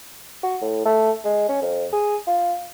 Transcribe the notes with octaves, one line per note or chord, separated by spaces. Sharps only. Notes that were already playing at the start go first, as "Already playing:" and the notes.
F#4
A2
A3
G#3
C#4
F2
G#4
F4